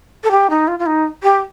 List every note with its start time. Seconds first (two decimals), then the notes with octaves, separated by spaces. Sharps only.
0.24 A4
0.31 G4
0.50 D#4
0.68 F4
0.79 F4
0.86 D#4
1.23 G4